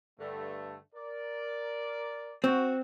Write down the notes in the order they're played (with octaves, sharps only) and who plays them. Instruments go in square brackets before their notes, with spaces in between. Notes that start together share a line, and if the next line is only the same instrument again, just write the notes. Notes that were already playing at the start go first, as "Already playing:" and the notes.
[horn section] G2 D3 A3
A#4 D5
[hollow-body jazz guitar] C4 [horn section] F#4